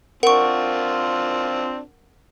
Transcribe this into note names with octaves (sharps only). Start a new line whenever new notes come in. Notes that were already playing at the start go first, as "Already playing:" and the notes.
C4 D4 F4 A#4 F#5 C#6